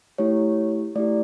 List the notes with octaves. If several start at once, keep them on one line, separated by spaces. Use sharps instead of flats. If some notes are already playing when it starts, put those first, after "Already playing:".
A3 E4 G4 C#5
A3 E4 G4 D5